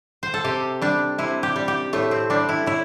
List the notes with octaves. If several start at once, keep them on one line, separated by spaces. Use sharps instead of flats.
C5
A4
C3 G4
G3 D4
C3 E4
G4
G3
G4
A2 A3
C4
G3 D4
E4
A2 E4